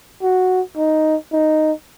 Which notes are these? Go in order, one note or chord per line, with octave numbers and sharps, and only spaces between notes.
F#4
D#4
D#4